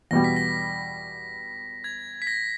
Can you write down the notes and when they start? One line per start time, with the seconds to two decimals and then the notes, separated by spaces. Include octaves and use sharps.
0.11 E2 B2 G3 A#6
0.24 B6
0.36 A#6
1.84 G#6
2.22 B6
2.27 A#6